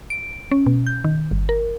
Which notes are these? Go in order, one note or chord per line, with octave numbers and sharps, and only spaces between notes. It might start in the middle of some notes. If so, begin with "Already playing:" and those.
D7
C#4
B2
G6
D#3
G1
A#4